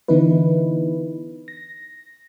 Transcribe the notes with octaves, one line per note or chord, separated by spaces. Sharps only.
D3 E3 B3 D#4 E4 B4
A#6